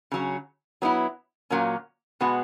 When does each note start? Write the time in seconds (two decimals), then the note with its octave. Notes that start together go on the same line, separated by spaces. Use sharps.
0.12 C#3 F#3 C#4
0.82 F#3 B3 E4
1.50 A#2 F#3 A#3 C#4
2.20 B2 G#3 B3 F#4